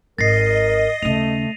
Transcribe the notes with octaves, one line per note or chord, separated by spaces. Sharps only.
G#1 A#4 D#5 A6 A#6 C7
D#2 C#3 A3 D#7 F7